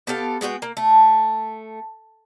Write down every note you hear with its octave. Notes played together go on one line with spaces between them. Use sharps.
B3 G4 A4 F5
G#3 B3 F#4 G5
A#3
A3